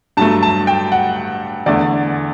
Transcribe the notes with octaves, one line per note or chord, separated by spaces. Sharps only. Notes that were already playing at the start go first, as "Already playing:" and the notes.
G2 F#3 A3 A5
A5
G5
F#5
E2 D3 A3 D5